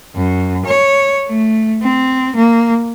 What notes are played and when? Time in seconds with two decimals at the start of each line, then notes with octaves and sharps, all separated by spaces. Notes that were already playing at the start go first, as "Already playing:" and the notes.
0.16 F#2
0.65 C#5
1.28 A3
1.83 C4
2.36 A#3